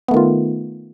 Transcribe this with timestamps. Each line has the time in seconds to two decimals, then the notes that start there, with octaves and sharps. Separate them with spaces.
0.08 B3
0.11 A3
0.14 D#3
0.17 F4